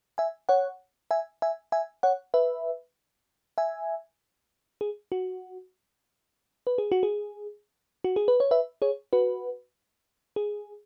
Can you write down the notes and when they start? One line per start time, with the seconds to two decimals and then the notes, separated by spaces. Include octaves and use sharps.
0.18 E5 G#5
0.49 C#5 F#5
1.11 E5 G#5
1.42 E5 G#5
1.72 E5 G#5
2.03 C#5 F#5
2.34 B4 E5
3.58 E5 G#5
4.81 G#4
5.12 F#4
6.67 B4
6.78 G#4
6.92 F#4
7.03 G#4
8.04 F#4
8.16 G#4
8.28 B4
8.40 C#5
8.51 B4 E5
8.82 G#4 C#5
9.13 F#4 B4
10.36 G#4